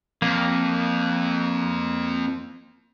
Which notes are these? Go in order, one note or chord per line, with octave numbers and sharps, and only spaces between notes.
F2 A#3